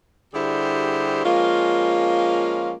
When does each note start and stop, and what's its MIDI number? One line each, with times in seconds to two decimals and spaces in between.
0.34 1.22 50
0.34 1.22 55
0.34 1.22 64
0.34 1.22 67
0.34 1.22 68
0.34 1.22 72
1.25 2.73 53
1.25 2.73 56
1.25 2.73 58
1.25 2.73 61
1.25 2.73 65